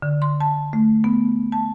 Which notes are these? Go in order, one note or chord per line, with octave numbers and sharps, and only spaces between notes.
D3
C6
A5
A3
B3
A5